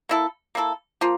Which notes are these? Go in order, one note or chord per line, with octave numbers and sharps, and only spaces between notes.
A#3 E4 A4
A#3 E4 A4
F3 A#3 F4